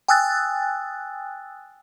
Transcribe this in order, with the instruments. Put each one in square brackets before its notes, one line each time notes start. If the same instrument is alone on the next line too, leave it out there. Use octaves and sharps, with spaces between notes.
[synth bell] G5 G#5 D#6 E6 F#6 A6